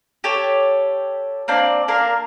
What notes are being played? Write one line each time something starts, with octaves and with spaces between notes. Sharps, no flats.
G4 A4 C#5 A5
A#3 C4 D4 D5
A#3 D4 A#4 C6